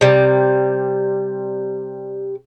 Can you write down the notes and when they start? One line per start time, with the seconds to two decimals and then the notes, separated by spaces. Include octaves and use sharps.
0.01 C3 G3